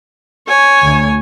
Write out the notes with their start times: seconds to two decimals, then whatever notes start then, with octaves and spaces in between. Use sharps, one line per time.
0.48 C#5 G#5
0.82 D2